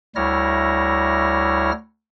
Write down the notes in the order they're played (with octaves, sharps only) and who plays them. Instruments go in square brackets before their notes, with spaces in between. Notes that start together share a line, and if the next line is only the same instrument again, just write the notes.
[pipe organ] D2 G3 E4 C#5 F6 A#6